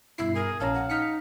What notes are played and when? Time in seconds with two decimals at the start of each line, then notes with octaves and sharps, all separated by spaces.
0.18 G2 B2 E4 C7
0.35 G#4 A#4
0.60 A#1 C#4 F5 A5 A#5
0.74 F#5
0.90 D#4 F6 B6 C#7